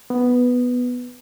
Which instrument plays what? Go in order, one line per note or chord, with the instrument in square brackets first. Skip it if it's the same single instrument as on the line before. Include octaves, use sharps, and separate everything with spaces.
[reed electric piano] B3